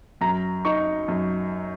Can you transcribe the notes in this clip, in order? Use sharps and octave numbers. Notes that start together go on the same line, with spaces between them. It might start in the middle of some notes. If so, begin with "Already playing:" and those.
F#2 A#5
D#4 C#6
F#2